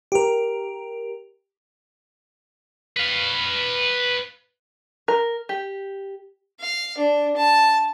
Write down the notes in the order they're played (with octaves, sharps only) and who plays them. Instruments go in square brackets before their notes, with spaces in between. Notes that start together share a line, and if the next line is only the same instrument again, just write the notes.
[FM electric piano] G4 A#4
[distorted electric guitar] B4 F5
[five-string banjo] A#4
G4
[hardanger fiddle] F5
D4
A5